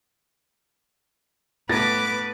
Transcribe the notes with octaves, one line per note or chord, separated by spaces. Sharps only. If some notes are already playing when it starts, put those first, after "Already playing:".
A2 B3 B4 D6 A6 A#6